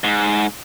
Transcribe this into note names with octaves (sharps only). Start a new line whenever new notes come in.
G#2